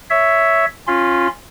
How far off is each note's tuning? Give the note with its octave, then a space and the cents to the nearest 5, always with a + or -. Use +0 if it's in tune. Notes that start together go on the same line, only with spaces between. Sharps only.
C#5 +5 E5 +0
C#4 -25 F4 +0 C6 -45